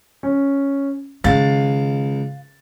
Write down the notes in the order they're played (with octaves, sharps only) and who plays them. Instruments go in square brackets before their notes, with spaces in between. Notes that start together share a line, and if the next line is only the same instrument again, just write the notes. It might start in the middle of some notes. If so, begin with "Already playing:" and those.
[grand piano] C#4
[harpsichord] C#2 [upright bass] D#3 [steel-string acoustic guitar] F5 [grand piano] A6